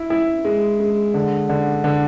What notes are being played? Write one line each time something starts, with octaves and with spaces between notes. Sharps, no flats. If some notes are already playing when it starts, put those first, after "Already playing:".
Already playing: E4
E4
G#3
G#3
D3
D3
D3